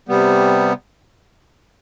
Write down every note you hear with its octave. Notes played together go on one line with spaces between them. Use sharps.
C3 G3 B3